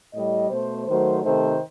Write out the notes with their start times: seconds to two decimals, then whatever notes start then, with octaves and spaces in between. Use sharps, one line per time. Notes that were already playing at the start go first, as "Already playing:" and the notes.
0.14 A2 G3 D#5
0.50 B2 A3 C5
0.86 D#3 F#3 A3 C5
1.23 C3 D#3 A3 C5